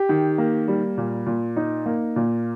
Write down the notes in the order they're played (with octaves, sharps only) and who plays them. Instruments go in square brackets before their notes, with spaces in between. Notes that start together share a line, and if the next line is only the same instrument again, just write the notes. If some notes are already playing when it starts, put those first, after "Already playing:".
Already playing: [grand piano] G4
[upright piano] D#3
A#3
G3
A#2
A#2
D#4
A#3
A#2